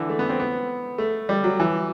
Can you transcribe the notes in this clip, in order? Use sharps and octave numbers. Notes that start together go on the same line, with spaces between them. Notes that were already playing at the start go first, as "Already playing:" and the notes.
Already playing: D3 E3
A3
B3
C4
B3
A3
G3
F#3
E3